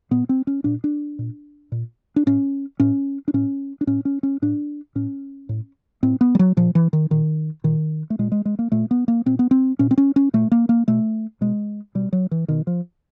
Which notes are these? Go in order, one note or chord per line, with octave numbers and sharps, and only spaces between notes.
A#2 B3
C4
C#4
A#2 D4
D4
A#2
A#2
D4
A2 C#4
A2 C#4
D4
A2 C#4
D4
A2 C#4
C#4
C#4
A2 D4
A2 C#4
A2
A2 C4
B3
G3
F#3
A#2 F3
E3
D#3
A#2 D#3
A#2 D#3
A3
A#2 G#3
G#3
G#3
A#3
A#2 A3
B3
A#3
A#2 C4
B3
C4
A#2 C#4
C4
C#4
C#4
A#2 A3
A#3
A#3
B2 A3
B2 G#3
B2 G3
F#3
E3
B2 D#3
F3